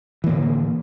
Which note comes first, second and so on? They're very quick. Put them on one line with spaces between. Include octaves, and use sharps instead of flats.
E3 A#3 A2 D3